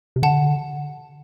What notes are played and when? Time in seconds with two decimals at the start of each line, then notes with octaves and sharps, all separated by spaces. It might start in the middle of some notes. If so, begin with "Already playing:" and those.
0.16 C3
0.23 D3 F#5 A5